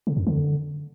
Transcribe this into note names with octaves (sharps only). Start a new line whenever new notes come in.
C#3
F2
D3